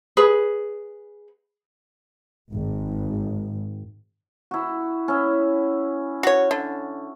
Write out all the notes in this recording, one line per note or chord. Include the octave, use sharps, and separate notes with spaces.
G#4 B4
G#1
E4 F#4
C#4 E4
F#4 C#5
D3